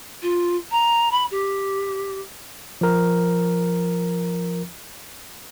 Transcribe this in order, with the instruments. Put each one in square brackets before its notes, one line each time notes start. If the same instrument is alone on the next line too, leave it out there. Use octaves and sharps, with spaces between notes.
[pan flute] F4
A#5
B5
G4
[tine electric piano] F3 A#4